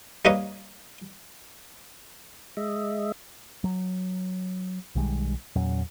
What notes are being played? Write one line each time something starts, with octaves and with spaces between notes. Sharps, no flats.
G3 A#3 D#4 B4 C#5 D#5
G#3 D#5 E5
F#3
B1 D#3 G3 G#3
E2 A#2 F#3 C#4